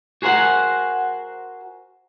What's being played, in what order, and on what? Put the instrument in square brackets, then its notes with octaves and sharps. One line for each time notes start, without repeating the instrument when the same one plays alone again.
[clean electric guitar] F#4 G#4 A#4 C5 F#5